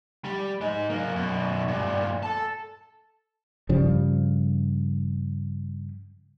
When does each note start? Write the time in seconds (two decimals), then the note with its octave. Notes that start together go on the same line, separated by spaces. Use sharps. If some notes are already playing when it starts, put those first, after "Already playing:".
0.25 G3
0.61 G#3 D#4
0.90 F#3 A#3
1.16 F#2 B2
1.68 G2 A#2
2.23 A4 A5
3.69 G2 C#3 F3 G3